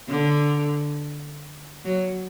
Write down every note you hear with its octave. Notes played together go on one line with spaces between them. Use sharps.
D3
F#3